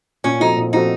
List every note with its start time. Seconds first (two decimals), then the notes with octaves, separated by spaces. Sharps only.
0.24 A#2 C#4
0.40 F3 C4 D#4 F#4 A4
0.57 A#2
0.73 F3 C4 D#4 F#4 A4